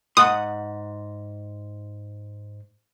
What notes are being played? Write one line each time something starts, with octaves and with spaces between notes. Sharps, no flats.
G#2 F#5 C6 D#6